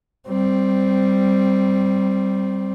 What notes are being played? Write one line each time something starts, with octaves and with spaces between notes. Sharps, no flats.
G3 C4